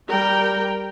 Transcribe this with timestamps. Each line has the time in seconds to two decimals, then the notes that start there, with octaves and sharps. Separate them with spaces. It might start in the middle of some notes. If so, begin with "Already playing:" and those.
0.10 G3 A#4 G5